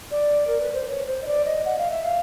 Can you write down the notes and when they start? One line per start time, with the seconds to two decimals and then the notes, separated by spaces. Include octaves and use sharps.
0.11 D5
0.47 A#4
0.61 B4
0.74 C5
0.88 C#5
1.07 C5
1.23 D#5
1.27 D5
1.45 D#5
1.65 F#5
1.78 F5
1.90 E5
2.03 F5